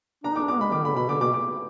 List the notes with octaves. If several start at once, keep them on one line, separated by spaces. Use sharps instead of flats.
D4 A#5
D#4 D6
D4
B3 D6
G#3 B5
D#3 D6
D3 B5
B2 B5
D3 D6
B2 D6
D6